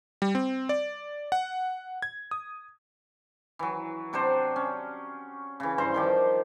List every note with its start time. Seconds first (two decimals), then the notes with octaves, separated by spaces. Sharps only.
0.22 G3
0.35 C4
0.69 D5
1.32 F#5
2.02 G#6
2.31 D#6
3.59 E3 F#3
4.13 C3 F#3 D4 C5
4.56 C#4
5.60 C#3 E3
5.78 G2 C5 A#5 C6
5.94 D#3 F3 G4